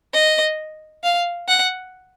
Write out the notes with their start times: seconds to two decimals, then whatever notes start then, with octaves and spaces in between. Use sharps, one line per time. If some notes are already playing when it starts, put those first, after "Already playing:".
0.14 D#5
1.03 F5
1.48 F#5